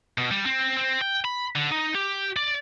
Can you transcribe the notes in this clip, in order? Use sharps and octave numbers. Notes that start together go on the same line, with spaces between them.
B2
G3
C4
C4
G5
B5
D3
D#4
G4
D5